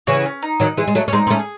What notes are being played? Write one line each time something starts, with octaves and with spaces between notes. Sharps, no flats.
C#3 E3 F#4
C#4
D#4
D#3 F#3
E3 G#3
G#3
F#3 A3
C#4
G#3 C4 D#4
C4
A3 C#4
G#4